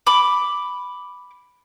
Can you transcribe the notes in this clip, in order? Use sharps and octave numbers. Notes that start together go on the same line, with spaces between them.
B5 D6